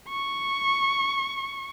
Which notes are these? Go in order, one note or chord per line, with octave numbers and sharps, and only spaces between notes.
C#6